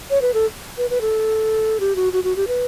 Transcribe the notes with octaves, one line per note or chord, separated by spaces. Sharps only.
C#5
B4
A4
B4
B4
A4
G4
F#4
F#4
F#4
G4
B4